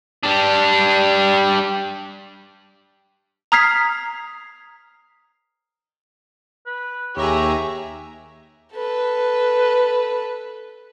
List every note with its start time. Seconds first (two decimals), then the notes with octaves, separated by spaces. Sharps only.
0.23 G3 D4
3.52 A#5 D#6 F6 G#6 B6 C7
6.66 B4
7.16 D#2 G4 G#4 C#5 E5 A#5
8.73 A4 B4